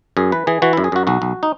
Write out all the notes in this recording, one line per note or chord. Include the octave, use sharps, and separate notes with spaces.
F#2 G#4
E3 B4
E3 G#4
E3 F#4
F#2 E4
G#4
F#2 F#4
B1 F#4
B1
D#4